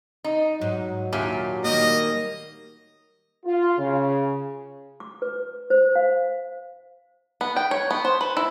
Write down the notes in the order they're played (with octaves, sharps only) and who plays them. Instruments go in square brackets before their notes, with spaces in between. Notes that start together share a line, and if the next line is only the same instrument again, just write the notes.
[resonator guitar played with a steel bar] D#4
[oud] G#2 [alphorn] F#3
[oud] D#2 D4 E5 [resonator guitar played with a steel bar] A#2 G4 G#5
[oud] D#3 G3 A#3 [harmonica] D#5
[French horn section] F4
C#3
[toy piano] D6
B4
C5
F5
[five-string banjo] B3
G5
C#5
B3
C5
B4
E4